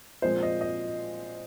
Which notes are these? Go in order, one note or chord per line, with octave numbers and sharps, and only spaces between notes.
A#2 F3 G#3 C4 C5
D#5
D#5